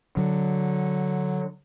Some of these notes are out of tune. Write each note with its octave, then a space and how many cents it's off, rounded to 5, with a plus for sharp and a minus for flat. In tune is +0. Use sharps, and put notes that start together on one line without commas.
D3 +0 F#3 +0